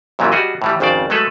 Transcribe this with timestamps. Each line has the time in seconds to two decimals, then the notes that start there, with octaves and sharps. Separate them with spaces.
0.19 F#2 A#2 E3 F#3 G3
0.32 G3 F#4 G#4 D#5
0.62 A2 E3 G3
0.80 G#1 F2 C#3 C5 D5
1.10 F#3 G#3 A3 A4 B4